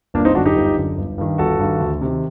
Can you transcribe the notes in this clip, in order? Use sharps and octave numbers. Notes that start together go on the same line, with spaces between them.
G1 A#3 D4
C4 D#4
F#2 D3 D4 F#4
D#4 G4
G1
F#2 D3
G1
G2 D#3
G1 F#4 A4
G2 D#3
D2
C3 D#3